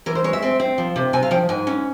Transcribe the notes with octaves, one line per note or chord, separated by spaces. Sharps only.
E3 A#4
C5
G#3 C#5
E5
C4
C4
F3
C3
C3 G#5
F5
F3 G5
G#2 G#5
C#4